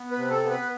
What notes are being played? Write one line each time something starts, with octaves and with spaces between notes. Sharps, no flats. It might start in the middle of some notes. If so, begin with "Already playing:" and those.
Already playing: B3
B4
C3
A4
B3
B4